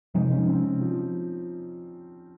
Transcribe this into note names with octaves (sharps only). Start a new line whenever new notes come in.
C3 F3 G#3 D#4
C#4
C4
F3